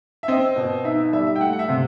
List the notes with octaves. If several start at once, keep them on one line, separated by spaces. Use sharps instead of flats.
E5
C4 D#5
B2
D#4 E5
E5
G3 E5
E5
G5
A3 F#5
F#5
E5
C3